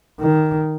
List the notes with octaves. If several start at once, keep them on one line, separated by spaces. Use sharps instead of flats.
D#3